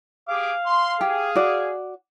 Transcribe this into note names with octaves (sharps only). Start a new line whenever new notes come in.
G4 G#4 F5 D6
C6
G4 G#4
F#4 D5